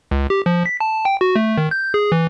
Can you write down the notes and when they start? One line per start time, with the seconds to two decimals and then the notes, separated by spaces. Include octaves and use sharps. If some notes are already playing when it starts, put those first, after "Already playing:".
0.11 C#2
0.30 G4
0.46 F3
0.66 B6
0.80 A5
1.05 G5
1.21 F#4
1.36 A3
1.58 D#3
1.71 G6
1.94 G#4
2.12 E3